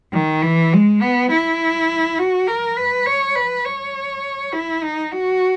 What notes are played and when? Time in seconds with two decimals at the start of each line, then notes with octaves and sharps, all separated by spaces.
0.13 D#3
0.43 E3
0.73 G#3
1.02 B3
1.31 E4
2.19 F#4
2.48 A#4
2.78 B4
3.06 C#5
3.35 B4
3.65 C#5
4.53 E4
4.83 D#4
5.12 F#4